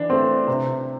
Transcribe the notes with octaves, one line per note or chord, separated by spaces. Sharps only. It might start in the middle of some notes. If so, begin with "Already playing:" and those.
Already playing: E3 D4
A3 C4
C3